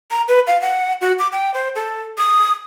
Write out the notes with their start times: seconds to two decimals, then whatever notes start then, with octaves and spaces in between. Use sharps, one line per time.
0.11 A#5
0.28 B4
0.47 F5
0.62 F#5
1.01 F#4
1.19 D6
1.32 G5
1.54 C5
1.76 A4
2.18 D#6